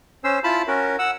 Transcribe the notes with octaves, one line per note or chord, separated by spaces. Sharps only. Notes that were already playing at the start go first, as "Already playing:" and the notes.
C#4 C5 E6
E4 F4 A5 B5
C#4 F#4 A#4
F#5 E6